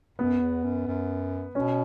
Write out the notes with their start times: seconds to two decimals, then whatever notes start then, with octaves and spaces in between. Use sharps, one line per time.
0.18 F#2 B3
0.41 E2
0.64 F#2
0.87 F#2
1.55 B2 C#4